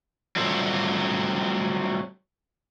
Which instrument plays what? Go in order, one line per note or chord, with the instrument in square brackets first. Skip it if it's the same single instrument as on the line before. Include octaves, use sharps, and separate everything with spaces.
[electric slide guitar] F#3 G3 A3 C4 F4 A4